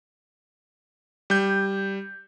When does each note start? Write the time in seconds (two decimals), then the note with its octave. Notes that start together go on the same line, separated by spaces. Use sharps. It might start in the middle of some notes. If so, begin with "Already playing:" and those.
1.30 G3 G6